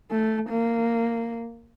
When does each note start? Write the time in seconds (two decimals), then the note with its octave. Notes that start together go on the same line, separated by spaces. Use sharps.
0.11 A3
0.50 A#3